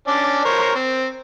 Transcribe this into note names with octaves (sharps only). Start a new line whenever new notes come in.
C#4 D4 D5
A#4 C5 C#5
C4